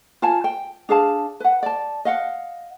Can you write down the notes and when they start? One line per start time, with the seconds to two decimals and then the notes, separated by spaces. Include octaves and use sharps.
0.22 F4 F5 G#5 A5
0.44 G5
0.89 D4 G#4 F5 A5
1.40 B4 F#5
1.63 D5 A5
2.05 D#5 F5 F#5